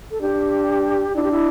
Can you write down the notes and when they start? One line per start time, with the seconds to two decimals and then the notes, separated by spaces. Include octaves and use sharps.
0.11 A4
0.21 D4 G4
1.16 D4 E4
1.23 G4
1.31 E4